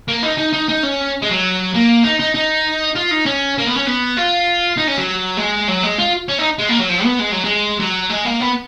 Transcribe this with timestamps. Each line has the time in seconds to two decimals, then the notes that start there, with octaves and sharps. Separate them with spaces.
0.08 A#3
0.23 D#4
0.38 D#4
0.53 D#4
0.69 D#4
0.84 C#4
1.22 G#3
1.29 F#3
1.75 A#3
2.04 D#4
2.20 D#4
2.35 D#4
2.95 F4
3.11 D#4
3.26 C#4
3.58 A#3
3.66 B3
3.76 C#4
3.86 B3
4.17 F4
4.77 D#4
4.87 C#4
4.98 F#3
5.37 G#3
5.68 F#3
5.83 G#3
5.98 F4
6.28 C#4
6.39 D#4
6.59 G#3
6.69 A#3
6.80 F#3
6.89 F3
7.04 B3
7.19 G#3
7.32 F#3
7.45 G#3
7.80 F#3
8.10 G#3
8.25 A#3
8.41 B3